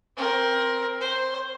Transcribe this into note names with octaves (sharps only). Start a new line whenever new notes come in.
C4 A#4
C5